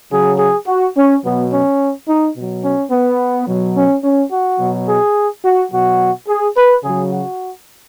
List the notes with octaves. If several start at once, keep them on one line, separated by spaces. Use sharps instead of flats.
C#3 F#3 G#4
G#4
F#4
C#4
B2 F#3 B3
C#4
D#4
B2 F#3
C#4
B3
B2 F#3
C#4
C#4
F#4
B2 F#3
G#4
F#4
B2 F#3 F#4
G#4
B4
C#3 F#3 G#4
F#4